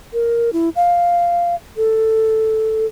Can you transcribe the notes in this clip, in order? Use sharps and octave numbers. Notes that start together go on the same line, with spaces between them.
A#4
E4
F5
A4